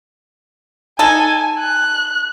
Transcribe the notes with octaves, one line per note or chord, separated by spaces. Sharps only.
D#4 A4 G#5
F#6